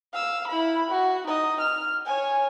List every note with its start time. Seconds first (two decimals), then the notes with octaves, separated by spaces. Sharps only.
0.13 F5 E6
0.48 E4 B5
0.90 F#4
1.27 D#4 D#5
1.61 F6
2.05 C#5 G#5